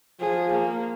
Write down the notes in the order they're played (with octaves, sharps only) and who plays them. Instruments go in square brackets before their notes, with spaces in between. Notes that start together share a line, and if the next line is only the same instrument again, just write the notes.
[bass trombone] F3 [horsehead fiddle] G#4
[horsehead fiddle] A#3